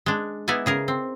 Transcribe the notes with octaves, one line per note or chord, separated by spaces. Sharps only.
G#3 D4
B3 D#4 E4 D5 G#5
C#3 G#4 A#4
C4